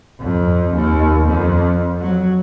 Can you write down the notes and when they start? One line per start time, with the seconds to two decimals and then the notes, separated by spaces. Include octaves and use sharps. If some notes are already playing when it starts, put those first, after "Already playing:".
0.21 F2
0.74 D#2
1.27 F2
2.00 F#3